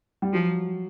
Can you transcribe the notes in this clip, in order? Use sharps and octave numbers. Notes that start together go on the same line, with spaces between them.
G3
F3 F#3